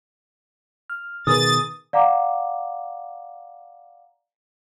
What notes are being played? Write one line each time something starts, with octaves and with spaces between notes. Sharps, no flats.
F6
B2 D#3 G#4 A#4 B4 D#6 A6
D5 F5 F#5 A#5 D6